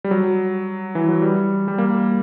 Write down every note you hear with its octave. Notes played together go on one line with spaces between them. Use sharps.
G3
F#3
E3
F#3
G3
G3
A#3